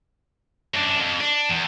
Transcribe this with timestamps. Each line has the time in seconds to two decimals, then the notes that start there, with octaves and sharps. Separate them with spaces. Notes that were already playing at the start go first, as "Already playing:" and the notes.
0.74 F#2 D4
1.00 F2
1.21 D4
1.49 E2